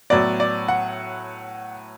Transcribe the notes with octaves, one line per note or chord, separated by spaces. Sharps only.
A2 F#3 B3 D5
D5
F#5